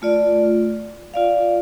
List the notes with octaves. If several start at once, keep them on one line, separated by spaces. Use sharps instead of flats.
A3 F4 D5
F4 D5 F5